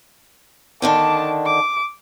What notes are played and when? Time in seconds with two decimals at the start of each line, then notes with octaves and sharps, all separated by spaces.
0.82 D3 D#3 D4 A5 D6
1.46 D6